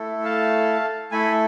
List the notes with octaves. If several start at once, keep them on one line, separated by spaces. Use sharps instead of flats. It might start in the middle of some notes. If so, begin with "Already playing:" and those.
Already playing: A3 E4 A4
F5 A5
A3 E4 A4 G#5 B5